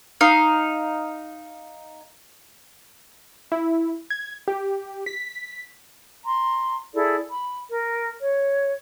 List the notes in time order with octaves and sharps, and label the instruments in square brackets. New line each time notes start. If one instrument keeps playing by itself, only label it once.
[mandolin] D#4 F5
[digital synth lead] E4
G#6
G4
B6
[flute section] A#5 C6
E4 G#4 A4 D5
B5
A#4
C#5